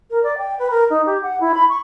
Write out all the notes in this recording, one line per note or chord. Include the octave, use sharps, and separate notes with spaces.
A#4
D5
G5
B4
A#4
D#4
G4
F#5
E4
B5
C#6